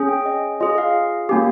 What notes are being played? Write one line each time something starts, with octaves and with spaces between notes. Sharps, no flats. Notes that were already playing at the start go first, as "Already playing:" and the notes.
Already playing: C#4 G#4
G5
D#5
C#4 F4 G#4 D#5
F5
A#3 C#4 G4